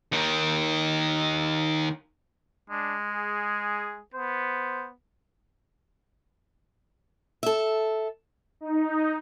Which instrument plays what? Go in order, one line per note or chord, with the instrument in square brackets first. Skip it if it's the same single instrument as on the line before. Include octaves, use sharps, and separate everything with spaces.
[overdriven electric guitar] D#2 D#3
[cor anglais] G#3 [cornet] D4
[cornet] G#4
[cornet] B3 [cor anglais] C5
[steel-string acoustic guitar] A4 E5
[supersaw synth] D#4